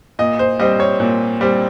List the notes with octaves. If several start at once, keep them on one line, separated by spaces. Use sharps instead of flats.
A#2 D#5
C5
G3 C4 D#5
C#5
A#2
G3 C4